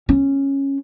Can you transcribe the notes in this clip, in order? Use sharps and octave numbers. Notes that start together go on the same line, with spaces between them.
C#4